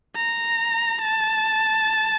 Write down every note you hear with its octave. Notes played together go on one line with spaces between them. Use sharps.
A#5
A5